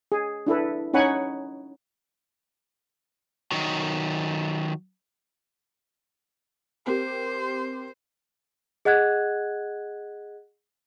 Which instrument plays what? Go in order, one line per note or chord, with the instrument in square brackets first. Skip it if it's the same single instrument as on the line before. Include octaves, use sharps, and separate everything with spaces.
[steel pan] G#4
D4 E4 A4 B4
C#4 D#4 C#5 F#5 G#5 B5
[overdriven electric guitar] D#3 F#3
[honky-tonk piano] C4 G4 A#4 [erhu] C5
[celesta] G#4 D#5 F#5 F#6 G#6